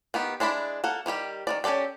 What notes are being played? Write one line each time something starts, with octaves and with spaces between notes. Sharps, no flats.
D#3 B3 G4
G#3 D4 E4 D5 B5
A#3 A4 F#5
D#3 G3 G4 G5
D#3 E3 D5
C#4 G4 A4 D5 G5